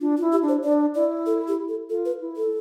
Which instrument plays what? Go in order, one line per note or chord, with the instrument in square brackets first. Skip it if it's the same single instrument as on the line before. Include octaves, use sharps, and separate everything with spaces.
[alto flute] D4 [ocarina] F4
[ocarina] F4
[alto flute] E4
[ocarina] G4
[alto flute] D4
[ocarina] C5
[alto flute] D4 [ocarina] D5
[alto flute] E4 [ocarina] D5
[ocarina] A4
G4
A4
[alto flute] F4 [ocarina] A4
[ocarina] B4
[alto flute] E4
[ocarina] A4